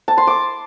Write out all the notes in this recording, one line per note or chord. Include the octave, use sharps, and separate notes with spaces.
A5
C6
D6